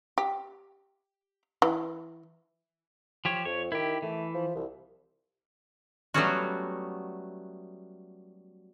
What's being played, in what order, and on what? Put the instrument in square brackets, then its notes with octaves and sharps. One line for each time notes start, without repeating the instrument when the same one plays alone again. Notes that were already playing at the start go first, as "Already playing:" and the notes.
[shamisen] G4
E3
[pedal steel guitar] F3 G4 C#5
[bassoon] F2 [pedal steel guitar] C#5
[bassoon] D#3 [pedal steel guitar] E4 G4
[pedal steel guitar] E3 [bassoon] A3
[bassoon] F3
C2
[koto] F#3 G3 A3 B3 C#4 F#4